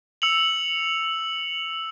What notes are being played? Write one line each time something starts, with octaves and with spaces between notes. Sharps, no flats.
E6 C#7 F7 F#7